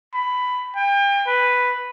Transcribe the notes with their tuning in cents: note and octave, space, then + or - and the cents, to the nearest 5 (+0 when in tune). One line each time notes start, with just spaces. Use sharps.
B5 +10
G5 +35
B4 +0